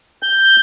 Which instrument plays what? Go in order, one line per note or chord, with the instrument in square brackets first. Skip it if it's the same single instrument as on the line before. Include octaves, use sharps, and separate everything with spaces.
[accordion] G6